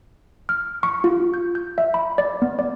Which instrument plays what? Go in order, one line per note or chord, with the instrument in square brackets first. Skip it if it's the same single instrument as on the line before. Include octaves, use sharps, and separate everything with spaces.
[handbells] F6
C#6
F4
G6
G6
E5
B5
D5
B3
D5